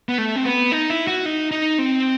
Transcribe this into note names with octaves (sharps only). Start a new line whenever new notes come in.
B3
A3
C4
B3
D#4
E4
F#4
D#4
D#4
C4